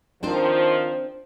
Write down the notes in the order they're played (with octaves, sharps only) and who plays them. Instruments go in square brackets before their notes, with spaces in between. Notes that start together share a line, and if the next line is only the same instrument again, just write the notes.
[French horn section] D#3 F3 [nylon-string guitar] C4 D4 C5